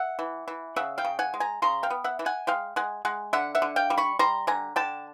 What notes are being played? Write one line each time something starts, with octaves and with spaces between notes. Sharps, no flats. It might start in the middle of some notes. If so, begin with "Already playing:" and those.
Already playing: E5 F#5
E3
E3
C#3 E5 F#5
F5 G5
C#3
F#5 G#5
G#3
G#5 A#5
C#3 A#5 C6
F5 G5
B3
E5 F#5
E3
F#5 G#5
G#3 F5 G5
G#3 F#5 G#5
G#3 F#5 G#5
D3 E5 F#5
E5 F#5
D3
F5 G5
G3
B5 C#6
G3 A#5 C6
D3 G#5 A#5
D3 G5 A5